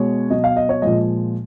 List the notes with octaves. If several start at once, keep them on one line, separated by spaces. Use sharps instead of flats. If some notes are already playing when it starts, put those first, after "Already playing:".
Already playing: B2 G#3 C#5
B2 F#3 D#5
F5
D#5
C#5
A#2 F3 G#3 D#5